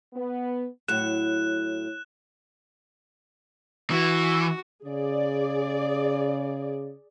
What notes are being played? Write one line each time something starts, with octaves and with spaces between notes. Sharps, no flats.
B3
A2 F#3 F#6 E7
E3 F#4
C#3 G#4 D5